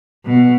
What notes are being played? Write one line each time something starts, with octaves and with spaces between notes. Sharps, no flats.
B2